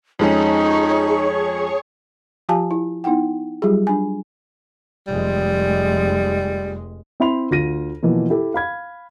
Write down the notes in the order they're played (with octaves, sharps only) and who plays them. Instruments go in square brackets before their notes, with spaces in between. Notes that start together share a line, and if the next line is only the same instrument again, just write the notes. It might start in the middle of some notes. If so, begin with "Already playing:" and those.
[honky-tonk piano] F2 G#3 C#4 [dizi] D#4 [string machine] G#4 C#5 C#6
[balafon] F3 F4 G4 F5 G#5 A5
E4
B3 D#4 E4 F#5 G5
F#3 G3 F4 G4 G#4
D4 G#5
[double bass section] F1 G#3 [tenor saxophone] G3
[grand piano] C4 E4 E5 B5 C6 F7
D2 F4 A#6 D#7
B2 E3 F3 A#3
E4 G4 A4
F5 B5 G#6